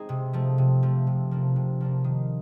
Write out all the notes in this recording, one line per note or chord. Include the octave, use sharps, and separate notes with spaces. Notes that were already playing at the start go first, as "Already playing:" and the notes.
Already playing: G#3 C4 D#4 G#4
C3
F3 A3
C3
F3 A3
C3
F3 A#3 D4
C3
F3 A#3 D4
D#3